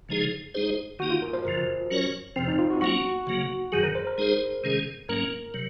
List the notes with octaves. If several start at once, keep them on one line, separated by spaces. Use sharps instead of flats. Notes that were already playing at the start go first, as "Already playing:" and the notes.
C#3 F3 G#3 D#4 G#4
G#3 D#4 G#4 C5
D#3 A#3 D#4 F#4
F4
A#4
C5
F#2 C#3 F3 A#4
F#3 C#4 F#4 A#4 C#5
F2 C3 F3 C4
D#4
F4
F#4
F#3 A#3 C#4 F#4
C#3 F#3 A#3
F#2 D#3 F#3 G#4
A#4
C5
A#4
G#3 D#4 G#4 C5
C3 D#3 G#3 C#4 G#4
G#2 F#3 A#3 C#4 A#4
C3 F#3